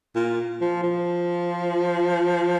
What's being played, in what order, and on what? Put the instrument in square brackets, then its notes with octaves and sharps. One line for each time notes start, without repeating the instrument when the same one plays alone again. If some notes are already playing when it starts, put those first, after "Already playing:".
[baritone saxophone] A#2
F3
F3